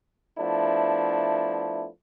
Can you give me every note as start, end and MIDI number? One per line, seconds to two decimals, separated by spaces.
0.38 1.88 53
0.38 1.88 57
0.38 1.88 59
0.38 1.88 62
0.38 1.88 64